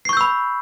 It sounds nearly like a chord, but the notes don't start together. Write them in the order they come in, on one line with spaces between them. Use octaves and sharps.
C7 C#6 G6 E6 B5